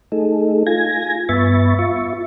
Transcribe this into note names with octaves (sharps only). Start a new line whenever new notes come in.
A3 D#4 G#4 A4
F4 G#5 G#6 A#6
G2 B3 E5 B5 C#6 A6
F4 E5 C#6